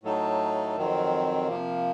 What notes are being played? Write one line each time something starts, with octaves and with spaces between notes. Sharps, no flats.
A2 F#3 A3 D#4 A4
F2 D#3 F#3 C4
C3 F3 A#3